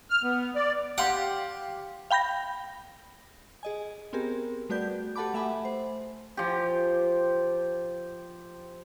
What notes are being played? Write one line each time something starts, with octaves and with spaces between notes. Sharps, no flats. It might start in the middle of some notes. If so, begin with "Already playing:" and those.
F6
B3
D5
G4 F5 F#5 C6
F5 G5 B5 G6 A#6
G#4 D#5 G#5
B3 C4 G4 G#4 A#4
G3 A3 F#4 B4 D5 G6
G4 A4 F#5 A5 B5 D6
A3 E5 F#5 G#5 B5
C5
F3 G4